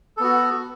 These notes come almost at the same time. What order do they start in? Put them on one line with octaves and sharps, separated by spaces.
A4 B3 F#4